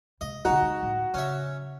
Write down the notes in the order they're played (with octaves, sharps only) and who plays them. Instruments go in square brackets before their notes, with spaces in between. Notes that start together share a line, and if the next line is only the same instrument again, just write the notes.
[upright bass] C3 G#3 [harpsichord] D#5
[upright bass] B2 D3 [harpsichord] D#4 [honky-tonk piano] F#4
[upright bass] G#3
A2
[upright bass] C#3 [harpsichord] C#4 E5